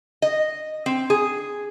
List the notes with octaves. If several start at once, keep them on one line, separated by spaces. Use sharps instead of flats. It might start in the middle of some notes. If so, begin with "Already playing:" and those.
D#5
C4
G#4